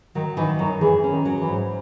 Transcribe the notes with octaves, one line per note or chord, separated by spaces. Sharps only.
D#3 F#3
D#3 E3
F#2 F#3
E3 G#4
C#4
D#3
F#3
E3
G#2